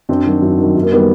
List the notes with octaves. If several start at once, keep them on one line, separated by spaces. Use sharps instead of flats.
F#2 C4 D4
D#3 F#3
F#2
D#3 F#3
F#2
A#3
D#3 G3 B3